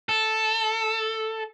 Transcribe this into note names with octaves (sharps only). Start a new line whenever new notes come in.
A4